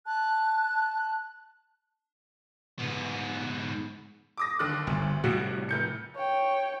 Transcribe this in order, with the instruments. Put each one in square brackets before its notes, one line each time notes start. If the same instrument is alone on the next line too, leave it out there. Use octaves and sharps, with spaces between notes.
[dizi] A5 [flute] F#6
[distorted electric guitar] G#2 B3
[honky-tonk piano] D6 D#6 A#6
D#2 D3 F#6
[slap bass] G1 [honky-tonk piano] D2
[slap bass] A2 C3 G3 [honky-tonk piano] F#4
[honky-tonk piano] F1 G6 C#7
[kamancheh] C#5 G5